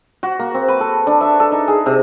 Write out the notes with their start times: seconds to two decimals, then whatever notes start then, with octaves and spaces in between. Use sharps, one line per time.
0.23 F#4
0.39 A#3
0.54 C4
0.68 B4
0.81 A4
1.07 D4
1.21 E5
1.40 A4
1.52 D#4
1.68 G#4
1.86 C3